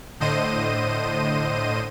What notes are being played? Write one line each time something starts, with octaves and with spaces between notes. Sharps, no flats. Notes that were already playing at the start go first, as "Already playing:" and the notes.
A2 D3 C5 D#5 D#7